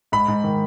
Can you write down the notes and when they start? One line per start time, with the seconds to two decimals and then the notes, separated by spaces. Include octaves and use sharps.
0.12 G#2 B5
0.28 G#2
0.44 D#3